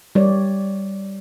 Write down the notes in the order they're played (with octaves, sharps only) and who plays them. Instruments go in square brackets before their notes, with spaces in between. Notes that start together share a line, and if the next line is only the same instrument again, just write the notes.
[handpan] G3 C#5 D5